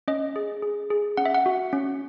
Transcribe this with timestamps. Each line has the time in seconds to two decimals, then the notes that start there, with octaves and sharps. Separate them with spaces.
0.08 C#4 D#5
0.36 G#4
0.63 G#4
0.90 G#4
1.17 C#4 F#5
1.26 E5
1.35 F#5
1.46 F#4
1.73 C#4